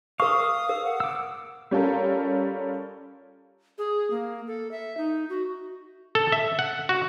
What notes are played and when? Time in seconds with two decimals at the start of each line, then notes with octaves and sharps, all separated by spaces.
0.20 A#4 F5 C#6 D#6
0.69 A#4
0.85 F#5
1.00 D6 E6
1.71 G3 C#4 F4 A4 A#4
3.78 G#4
4.11 A#3
4.47 A4
4.71 E5
4.97 D#4
5.30 F#4
6.15 A4
6.32 E5
6.59 F#5
6.89 F#4